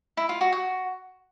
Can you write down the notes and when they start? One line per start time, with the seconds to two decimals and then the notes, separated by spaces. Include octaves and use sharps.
0.17 E4
0.29 F4
0.41 F#4
0.52 F#4